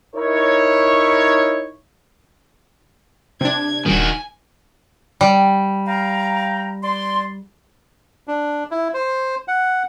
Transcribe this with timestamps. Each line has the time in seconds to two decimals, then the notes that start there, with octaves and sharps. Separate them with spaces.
0.16 D#4 E4 A#4 C#5
3.41 C3 D4 G#6
3.86 D#1 D#3 F#4 G#5
5.21 G3
5.87 F5 G5 A#5
6.83 D5 C6
8.28 D4
8.71 E4
8.94 C5
9.48 F#5